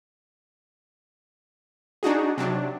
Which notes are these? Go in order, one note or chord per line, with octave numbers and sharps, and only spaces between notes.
D4 D#4 F#4 G#4
C3 F#3 D4